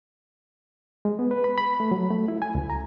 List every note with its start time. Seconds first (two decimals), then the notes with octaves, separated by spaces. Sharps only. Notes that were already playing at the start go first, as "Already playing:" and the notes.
1.05 G#3
1.19 B3
1.31 B4
1.44 B5
1.58 B5
1.80 A3
1.91 F#3
2.10 A3
2.28 E4
2.42 G#5
2.55 C#2
2.70 A#5